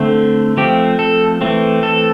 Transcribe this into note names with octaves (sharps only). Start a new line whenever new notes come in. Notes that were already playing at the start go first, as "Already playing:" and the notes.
Already playing: D3 A3 C4
F3 A3 C4 G4
A4
E3 A3 C4
A4